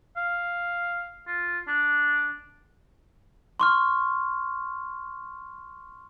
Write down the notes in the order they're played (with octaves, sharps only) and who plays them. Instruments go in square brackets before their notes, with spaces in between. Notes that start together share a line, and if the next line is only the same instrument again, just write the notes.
[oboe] F5
F4
D4
[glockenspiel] C6 C#6 F6